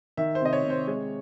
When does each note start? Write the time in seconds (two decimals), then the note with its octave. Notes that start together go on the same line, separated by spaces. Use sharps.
0.17 D#3 E5
0.35 C5
0.41 C3 D#5
0.53 C#5
0.64 C3
0.70 C5
0.87 G#3 C#5